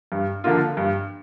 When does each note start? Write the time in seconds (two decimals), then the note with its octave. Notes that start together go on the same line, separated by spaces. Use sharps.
0.12 G2
0.44 D3 F3 A#3 F4
0.77 G2